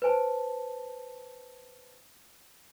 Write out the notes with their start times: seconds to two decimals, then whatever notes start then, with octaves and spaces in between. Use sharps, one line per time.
0.02 B4 C5 G#5 A5